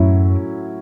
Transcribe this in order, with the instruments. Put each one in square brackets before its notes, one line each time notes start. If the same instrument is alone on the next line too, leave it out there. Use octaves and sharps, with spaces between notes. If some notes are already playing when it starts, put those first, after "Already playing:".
Already playing: [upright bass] F#2 [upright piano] A2 F#3 C#4 E4